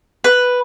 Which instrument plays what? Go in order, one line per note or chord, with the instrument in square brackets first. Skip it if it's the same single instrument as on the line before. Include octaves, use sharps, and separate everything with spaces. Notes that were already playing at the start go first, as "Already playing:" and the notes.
[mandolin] B4